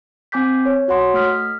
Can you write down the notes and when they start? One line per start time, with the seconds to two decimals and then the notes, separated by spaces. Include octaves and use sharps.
0.32 C4 G#5 D6 G6 B6
0.65 C#5
0.88 F#4 C#5 F#5 C6
1.14 A3 D#6 F6 B6